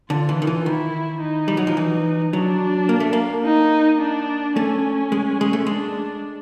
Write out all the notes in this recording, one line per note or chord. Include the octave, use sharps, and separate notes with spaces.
D3 F4
E3
D#3
E3
D#3 E4
D#4
G3
F#3
F3
E3
F#3 D4
A#3
A3
A#3
D#4
D4
A3 C#4
G#3
G#3
A3
G#3 D4